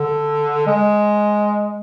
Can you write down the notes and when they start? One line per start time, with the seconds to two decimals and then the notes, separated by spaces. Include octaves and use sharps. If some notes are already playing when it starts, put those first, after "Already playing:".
Already playing: D3
0.66 G#3